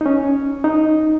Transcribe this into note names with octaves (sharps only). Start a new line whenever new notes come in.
D#4
C#4
D#4